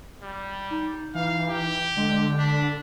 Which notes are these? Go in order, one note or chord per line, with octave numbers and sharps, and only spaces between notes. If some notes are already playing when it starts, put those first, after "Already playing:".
G3
D#4
E3 F5
G4
D3 G#3
D4 B6